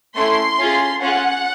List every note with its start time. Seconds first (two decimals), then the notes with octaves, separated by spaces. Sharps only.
0.15 A3 C#4 E4 C6
0.58 C#4 F4 G#4
1.01 C#4 F4 G#4 F#5